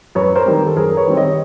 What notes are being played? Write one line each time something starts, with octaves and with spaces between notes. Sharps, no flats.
F#2 B4 C#5
A#4 C5
D#3 G3 C4
A4
F#2 G#4 A#4
B4 C#5
D#3 G3 C4
C#5 D#5